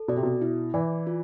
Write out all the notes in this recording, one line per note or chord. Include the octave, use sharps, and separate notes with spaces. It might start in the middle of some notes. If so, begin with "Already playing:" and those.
Already playing: A4
B2 D5
C3
B2
E4
E3 D5
F4